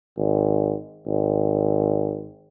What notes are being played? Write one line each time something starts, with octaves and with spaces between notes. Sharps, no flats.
G#1
G#1